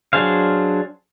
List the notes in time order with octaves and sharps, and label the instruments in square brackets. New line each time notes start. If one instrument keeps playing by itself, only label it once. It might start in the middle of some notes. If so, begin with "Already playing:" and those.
[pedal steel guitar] F#3 D4 G#4 C5 F5